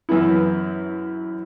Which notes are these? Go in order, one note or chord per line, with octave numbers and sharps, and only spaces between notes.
F#2 E3 B3 E4